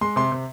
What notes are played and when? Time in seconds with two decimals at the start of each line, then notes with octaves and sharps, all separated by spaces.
0.01 G#3 C6
0.16 C3 C6
0.32 C3